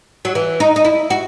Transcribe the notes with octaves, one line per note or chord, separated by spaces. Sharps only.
F#3
E3
D#4
D#4
E4
F#4